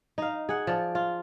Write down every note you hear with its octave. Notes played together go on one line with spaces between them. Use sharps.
D#4 F5
G#4 F#5
F3 D5
F4